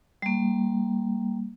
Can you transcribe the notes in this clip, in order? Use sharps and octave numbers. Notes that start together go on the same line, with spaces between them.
G3 A#3